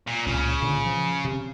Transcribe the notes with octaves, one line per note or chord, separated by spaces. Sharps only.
A#2
C#2 A#2 C#3
A#2 D3
F3
C3